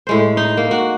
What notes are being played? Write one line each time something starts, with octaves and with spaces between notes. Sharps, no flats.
A2 G#3 C5
D#4
A#3
F#4